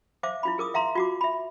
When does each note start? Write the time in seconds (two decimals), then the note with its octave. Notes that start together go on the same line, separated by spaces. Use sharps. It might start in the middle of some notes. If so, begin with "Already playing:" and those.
0.23 C5 E5 F5 D6
0.43 E4 F4 B5
0.58 G#4 A#4 D6 D#6
0.74 E5 F5 A#5 C6
0.96 F4 F#4 D6
1.21 E5 B5